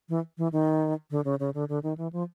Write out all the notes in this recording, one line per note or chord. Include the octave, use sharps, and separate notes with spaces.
E3
E3
D#3
D3
C#3
C#3
D3
D3
D#3
E3
F3